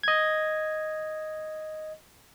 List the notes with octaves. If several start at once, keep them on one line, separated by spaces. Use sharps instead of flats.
D#5 G#6